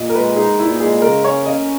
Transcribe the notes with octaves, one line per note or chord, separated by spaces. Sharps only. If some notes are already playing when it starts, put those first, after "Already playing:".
Already playing: A#2 D#5
A#4
G#3 B4
D#4 G#4
A#2 E4
G#3 G#4
C#3 A#4
C#4 C#5
C#4 D#5